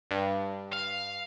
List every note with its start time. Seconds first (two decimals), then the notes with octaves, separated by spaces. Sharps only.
0.11 G2
0.73 F5